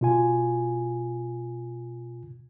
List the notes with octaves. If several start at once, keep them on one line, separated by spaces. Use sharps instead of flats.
B2 F4 G#5